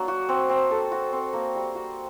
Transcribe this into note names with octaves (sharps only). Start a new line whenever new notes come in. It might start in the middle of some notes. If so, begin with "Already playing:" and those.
Already playing: F#3 A#3 D4
F#4
C4
C4
A4
F#4
C4
A#3
G3
F#4